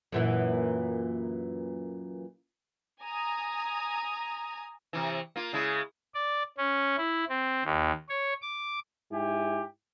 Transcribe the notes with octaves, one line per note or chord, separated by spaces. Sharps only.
F#2 A#2 E3
G#5 A#5 D#6
C3 E3
A#3 F4
C#3 G#3 E4
D5
C#4
E4
C4
D#2
C#5
D6
G#2 E4 G4 G#5